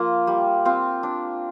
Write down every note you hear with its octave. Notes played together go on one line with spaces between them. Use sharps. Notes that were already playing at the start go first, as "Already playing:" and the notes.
Already playing: F3 A#3 F4 A#4
G3
C4 F4
D4